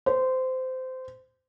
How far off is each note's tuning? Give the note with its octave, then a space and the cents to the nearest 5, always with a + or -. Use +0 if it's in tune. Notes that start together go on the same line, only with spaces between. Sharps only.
C5 -20